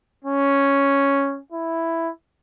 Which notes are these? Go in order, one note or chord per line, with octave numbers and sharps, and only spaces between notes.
C#4
E4